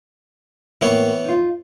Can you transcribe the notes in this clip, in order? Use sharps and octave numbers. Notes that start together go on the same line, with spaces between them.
A2 E3 A#3 B3 C#5
D#4 F4